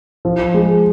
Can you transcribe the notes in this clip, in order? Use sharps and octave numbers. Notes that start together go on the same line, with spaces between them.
F3
G#3